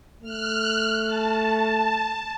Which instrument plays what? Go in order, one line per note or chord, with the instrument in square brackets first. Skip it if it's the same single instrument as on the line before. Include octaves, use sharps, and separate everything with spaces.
[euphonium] A3 [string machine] F6 F#6
[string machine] A5